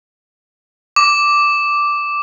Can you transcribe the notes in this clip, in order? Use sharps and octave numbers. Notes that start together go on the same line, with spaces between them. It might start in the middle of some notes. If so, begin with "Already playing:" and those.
D6